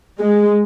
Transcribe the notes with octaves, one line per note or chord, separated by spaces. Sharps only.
G#3